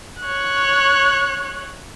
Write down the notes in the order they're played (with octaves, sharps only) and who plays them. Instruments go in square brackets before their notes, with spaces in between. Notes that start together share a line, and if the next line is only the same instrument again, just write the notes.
[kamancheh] C#5 F#6